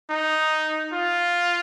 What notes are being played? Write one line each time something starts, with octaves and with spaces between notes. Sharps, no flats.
D#4
F4